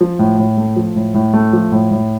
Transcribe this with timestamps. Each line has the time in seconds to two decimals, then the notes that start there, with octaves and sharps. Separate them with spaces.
0.01 F3
0.19 A2
0.38 A2
0.57 A3
0.76 F3
0.96 A2
1.14 A2
1.34 A3
1.53 F3
1.72 A2
1.91 A2